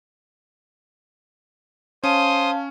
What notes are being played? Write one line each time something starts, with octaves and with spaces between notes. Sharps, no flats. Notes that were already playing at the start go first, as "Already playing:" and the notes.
C#4 C5 F5 A5 D#6